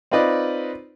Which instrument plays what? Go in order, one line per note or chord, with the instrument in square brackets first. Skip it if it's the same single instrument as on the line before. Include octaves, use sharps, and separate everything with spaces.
[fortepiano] C4 D#4 F4 B4 D5 D#5